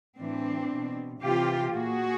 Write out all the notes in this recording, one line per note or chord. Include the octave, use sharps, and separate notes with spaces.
A2 E3 C4 D4
B2
C3 E3 F4 G4
A#2 F#4 G#4